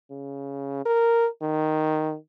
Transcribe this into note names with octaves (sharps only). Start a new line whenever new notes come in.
C#3
A#4
D#3